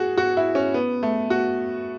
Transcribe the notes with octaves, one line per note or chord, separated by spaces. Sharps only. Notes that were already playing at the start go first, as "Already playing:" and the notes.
Already playing: F#4 G#4
F#4
E4
C#4
B3
A3
F#4